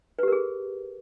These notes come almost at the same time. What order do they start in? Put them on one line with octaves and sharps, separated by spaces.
B4 G4 A#4 G#4